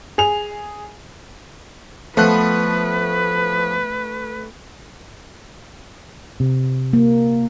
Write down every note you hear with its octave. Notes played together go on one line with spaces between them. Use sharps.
G#4 F7
F3 A3 B3 B4 F#6
C3
A#3